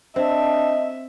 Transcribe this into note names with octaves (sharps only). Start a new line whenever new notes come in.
C4 D4 D#5 E5